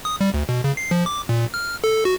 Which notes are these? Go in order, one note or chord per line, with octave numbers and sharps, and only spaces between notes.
D#6
G3
D2
B2
C#3
C7
F3
D6
A#2
F6
A4
F#4